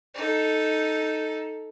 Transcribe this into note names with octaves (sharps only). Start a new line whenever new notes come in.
D#4 A4